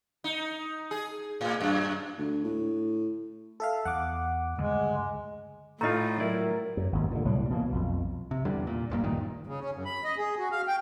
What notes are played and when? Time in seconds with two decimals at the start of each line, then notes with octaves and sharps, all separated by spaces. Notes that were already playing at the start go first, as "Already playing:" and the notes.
0.24 D#4
0.91 G#4
1.41 A2
1.61 F#2
2.18 D2
2.44 A2
3.60 A4 E5 F5
3.85 E2 F#5 D6
4.58 D2 G2 C#3 G#3
5.81 A2 A3 D#4 F4 D#5 A#5
6.20 F#3 E4 A#4 D5
6.77 F#2
6.92 G#1 D#2
7.11 A#2 D3
7.25 C2 A2 F#3 G3
7.50 B2 E3 F3 A#3
7.72 B1 F2
8.31 C3
8.45 E2 D3 G3
8.67 A#2
8.90 D1 A#1 G2 A#3
9.04 F#1 G2 A#2 D#3
9.47 C#3
9.60 C#4
9.73 F#2
9.85 B5
10.04 D#5
10.18 G#4
10.39 F#4
10.52 F5
10.68 G5